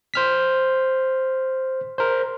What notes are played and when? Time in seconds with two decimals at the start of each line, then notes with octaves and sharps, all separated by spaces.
0.14 C5 F6 B6
1.98 A#4 C5